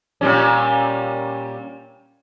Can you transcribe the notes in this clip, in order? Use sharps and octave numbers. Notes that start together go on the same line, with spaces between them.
A#2 G3 C#4